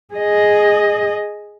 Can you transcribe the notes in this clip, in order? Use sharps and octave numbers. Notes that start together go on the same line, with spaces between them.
G#4 D#5